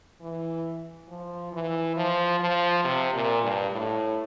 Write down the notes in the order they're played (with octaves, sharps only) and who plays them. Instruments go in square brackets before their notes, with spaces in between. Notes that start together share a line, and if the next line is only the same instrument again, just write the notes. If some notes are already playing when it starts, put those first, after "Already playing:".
[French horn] E3
F3
E3
F3
F3
C3
A#2
G2
A2